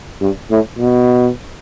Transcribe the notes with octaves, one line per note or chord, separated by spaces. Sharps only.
G2
A2
B2